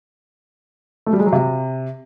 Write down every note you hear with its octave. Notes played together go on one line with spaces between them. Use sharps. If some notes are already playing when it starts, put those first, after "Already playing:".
A3
G3
G#3
F#3
C3